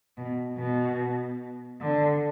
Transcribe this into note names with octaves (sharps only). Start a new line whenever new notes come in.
B2
B2
D3